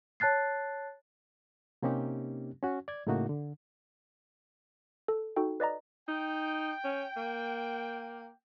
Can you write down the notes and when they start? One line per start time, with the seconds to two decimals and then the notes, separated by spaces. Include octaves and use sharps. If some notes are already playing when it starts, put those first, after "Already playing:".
0.20 C#5 A5 F#6 A6 C7
1.83 C3 A#3 C4 C#4 D#4 G4
2.63 C#4 F#4
2.88 D5 G#6
3.07 A2 C#3 A3 A#3 D#4 F#4
3.29 D3
5.08 A4
5.36 D#4 F#4 A4 G5
5.60 B4 D5 D#5 A#5
6.08 D#4 G5
6.84 C#4
7.17 A#3